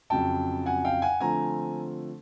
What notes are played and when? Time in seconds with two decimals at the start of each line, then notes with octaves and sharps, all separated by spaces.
0.10 F2 C#3 F#3 G5 A5
0.66 F#5 G#5
0.85 F5 G5
1.02 F#5 G#5
1.20 D3 F3 A3 C4 G#5 A#5